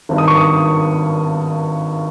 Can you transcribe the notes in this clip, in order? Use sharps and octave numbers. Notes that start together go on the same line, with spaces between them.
G#1 G2 D#3
D#6
C#6
D#6